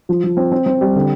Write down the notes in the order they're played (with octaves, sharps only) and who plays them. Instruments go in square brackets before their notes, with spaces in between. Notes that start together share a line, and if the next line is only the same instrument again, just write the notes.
[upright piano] F3
F3
C4
C4
C4
G3
D3